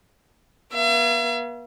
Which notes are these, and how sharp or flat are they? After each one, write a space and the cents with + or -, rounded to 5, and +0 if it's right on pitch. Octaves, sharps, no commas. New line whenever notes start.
B3 -45 E5 +45